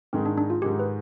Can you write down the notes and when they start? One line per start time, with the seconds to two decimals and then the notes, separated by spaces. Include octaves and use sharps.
0.13 G#2 D#3 G#3 C4
0.26 D4
0.38 D4
0.50 F4
0.62 G#2 D#3 G#3 G4
0.79 B4